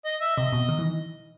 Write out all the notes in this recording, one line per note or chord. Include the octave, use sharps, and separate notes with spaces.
D#5
E5
C3 D#5
B2
D#3
E3